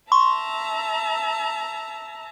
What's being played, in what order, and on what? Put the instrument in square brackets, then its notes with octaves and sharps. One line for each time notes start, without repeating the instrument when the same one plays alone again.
[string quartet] E5 A5 A#5 [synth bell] C6 C#6